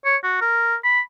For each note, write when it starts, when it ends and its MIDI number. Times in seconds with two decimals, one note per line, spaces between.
0.05 0.16 73
0.24 0.41 66
0.41 0.75 70
0.84 1.00 83